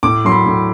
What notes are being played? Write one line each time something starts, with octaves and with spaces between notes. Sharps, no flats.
A2 D6
F#3 C6
B5
A2